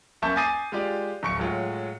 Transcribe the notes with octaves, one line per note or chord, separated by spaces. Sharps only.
F#2 A#3 E5 A5 C#6 G6
G#5 D6 D#6 A6 C7 D#7
G#3 F4 G4 D5
D1 C#6 C#7
A2 F#3 G#3 F4